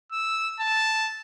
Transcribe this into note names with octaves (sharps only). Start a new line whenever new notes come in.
E6
A5